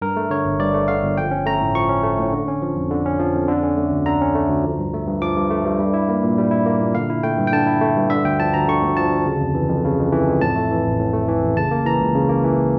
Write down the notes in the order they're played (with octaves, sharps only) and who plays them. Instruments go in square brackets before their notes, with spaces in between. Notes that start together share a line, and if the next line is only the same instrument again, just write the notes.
[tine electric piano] G2 A#4
A3
D3 C#5
G1
G2 D5
A3
D3 F5
G1
F3 G5
C#4
A3 A#5
A2
F3 C#6
C#4
A3
A2
D3
C#4
F3
F2
D3
C#4
F3
F2
D3
C#4
A3
D2
D3 A#5
C#4
A3
D2
F3
G2
A3
G2
F3 D6
G2
A3
G2
G3
E4
A#3
A#2
G3
E4
A#3
A#2
D3 F5
E4
A3 G5
G2
G5
D3 A5
E4
A3
G2
D3 E5
D2 G5
F3 A5
D2 A#5
D3 C#6
D2
F3 A5
D2
C#3
F2
E3
F2
C#3
F2
E3
F2
A2 A5
A3
E3
A1
A2
A3
E3
A1
C#3 A5
A#3
E3 A#5
C#2
C#3
A#3
E3